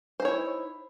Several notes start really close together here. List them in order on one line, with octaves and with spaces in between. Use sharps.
C5 D#4 C#5 E4